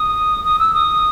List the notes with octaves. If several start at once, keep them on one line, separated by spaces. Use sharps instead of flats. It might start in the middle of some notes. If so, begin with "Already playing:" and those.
Already playing: D#6
D#6
E6
D#6